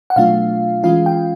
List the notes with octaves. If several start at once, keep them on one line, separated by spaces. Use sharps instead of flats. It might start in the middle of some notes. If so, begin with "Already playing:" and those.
F#5
B2 F#3 A3 D4 F4 F5
E3 G#3 C#4 F4 F5
G5